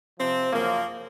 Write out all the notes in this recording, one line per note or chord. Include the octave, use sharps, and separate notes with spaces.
C3 F3 C4
F#2 C#3 F3 A#3